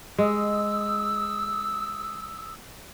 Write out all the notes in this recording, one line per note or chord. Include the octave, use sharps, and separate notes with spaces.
G#3 D#6 E6